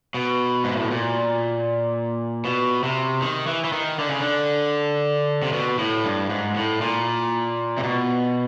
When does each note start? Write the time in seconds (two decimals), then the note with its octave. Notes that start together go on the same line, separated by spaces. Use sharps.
0.14 B2
0.64 G#2
0.77 A2
0.91 A#2
2.45 B2
2.83 C3
3.22 D#3
3.47 E3
3.64 E3
3.73 D#3
3.99 D3
4.09 C#3
4.20 D3
5.42 C3
5.53 B2
5.79 A2
6.04 G2
6.30 G#2
6.56 A2
6.81 A#2
7.77 C3
7.83 B2